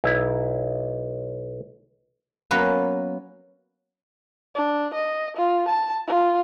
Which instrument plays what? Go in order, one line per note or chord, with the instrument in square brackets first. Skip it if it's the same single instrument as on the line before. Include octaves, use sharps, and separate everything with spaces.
[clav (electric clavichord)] B1 E4
[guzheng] F#3 A#3 B3 C#4 B4
[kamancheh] D4
D#5
F4
A5
F4